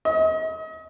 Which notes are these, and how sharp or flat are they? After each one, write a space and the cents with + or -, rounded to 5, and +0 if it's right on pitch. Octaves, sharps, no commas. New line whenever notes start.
D#5 +35